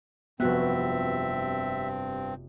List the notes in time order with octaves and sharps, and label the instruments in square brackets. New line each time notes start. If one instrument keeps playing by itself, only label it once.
[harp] F1 F#6 [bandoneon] G2 C4 [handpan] B3 F#4 [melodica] E5